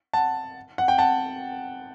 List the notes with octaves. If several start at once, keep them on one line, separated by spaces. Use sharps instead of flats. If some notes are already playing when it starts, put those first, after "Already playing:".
F#5 A5
F#5
G5
F#5 A5